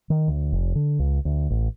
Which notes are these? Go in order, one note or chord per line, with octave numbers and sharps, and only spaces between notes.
D#3
D2
F1
D3
C#2
D2
A1